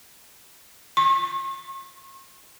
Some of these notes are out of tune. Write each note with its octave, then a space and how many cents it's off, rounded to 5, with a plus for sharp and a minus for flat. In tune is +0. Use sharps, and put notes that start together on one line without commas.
C#6 -45